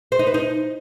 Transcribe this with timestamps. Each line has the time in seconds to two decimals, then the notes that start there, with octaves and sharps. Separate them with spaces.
0.12 C5
0.19 D#4
0.27 B4
0.34 D#4